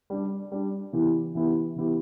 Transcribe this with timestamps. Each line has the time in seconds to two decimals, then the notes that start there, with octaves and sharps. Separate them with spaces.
0.10 G3 D4 G4
0.52 G3 D4 G4
0.93 E3 B3 E4 G4
1.35 E3 B3 E4 G4
1.76 E3 B3 E4 G4